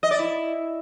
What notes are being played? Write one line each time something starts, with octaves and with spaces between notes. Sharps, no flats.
D#5
D5
E4